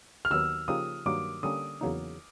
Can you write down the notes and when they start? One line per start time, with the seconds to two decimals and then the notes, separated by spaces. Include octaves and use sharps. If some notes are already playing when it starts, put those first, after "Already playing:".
0.25 F6
0.31 D#2 D#3 F#3 B3 E6
0.68 C#3 F3 A#3 D#4 G4 D#6
1.06 G2 D#3 F#3 A#3 D6
1.43 D3 G3 A#3 C#4 D#6
1.81 E2 C#3 F#3 A#3 D#4